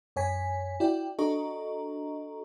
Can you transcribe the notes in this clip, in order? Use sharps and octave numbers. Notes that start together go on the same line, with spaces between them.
F#2 C#5 G#5 B6
E4 F#4 D5 G5
D4 F#4 A4 D#5 A#5 C#6